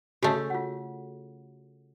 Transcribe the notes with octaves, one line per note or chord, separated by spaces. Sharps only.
C#3 A3 F#4 A4 C#5
F4 F#5